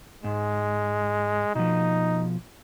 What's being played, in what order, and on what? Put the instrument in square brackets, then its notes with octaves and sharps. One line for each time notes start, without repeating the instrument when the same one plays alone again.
[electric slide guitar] G#2 [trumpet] G#3
[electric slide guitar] B2 F3 [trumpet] D#4